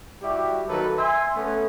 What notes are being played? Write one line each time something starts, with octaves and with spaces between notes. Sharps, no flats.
G3 E4 F#4 G4
D#3 F#3 A#3 A4 B4 A#5
E5 G#5 C6
A3 B3 C#4